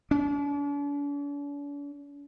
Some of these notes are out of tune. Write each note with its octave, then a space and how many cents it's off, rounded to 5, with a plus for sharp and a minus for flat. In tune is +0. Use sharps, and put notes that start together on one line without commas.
D4 -45